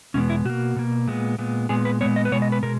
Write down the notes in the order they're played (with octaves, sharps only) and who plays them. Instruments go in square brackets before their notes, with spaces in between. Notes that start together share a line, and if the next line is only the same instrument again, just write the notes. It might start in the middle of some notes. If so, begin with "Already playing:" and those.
[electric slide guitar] E2 B2 G#3 B3 C#4
E4
B2 A#3 F#4
B2 A#3
A#2 G#3 B3
A#2 G#3 B3
A#2 G#3 B3 G#4
B4
A#2 G#3 B3 C#5
D#5
B4
B2 G#3 B3 C#5
D#5
B4
B2 G#3 A#4